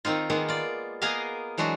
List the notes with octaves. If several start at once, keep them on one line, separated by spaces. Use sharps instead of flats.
D#3 C4 D#4 F4
D#3 G#3 A#3 B3
F4 D5
A#3 B3 G#4 A#4 D#5 F5
E3 F#3 G#3 D4 F#4